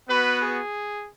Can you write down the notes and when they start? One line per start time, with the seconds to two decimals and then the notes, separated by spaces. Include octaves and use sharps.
0.09 B3 F#4 B4
0.42 G#4